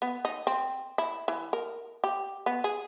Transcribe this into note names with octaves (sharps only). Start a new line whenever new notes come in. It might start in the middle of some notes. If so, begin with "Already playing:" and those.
B3
D#4
C4
E4
E3
A#4
G4
B3
G#4